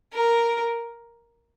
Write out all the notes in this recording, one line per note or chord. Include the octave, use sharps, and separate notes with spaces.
A#4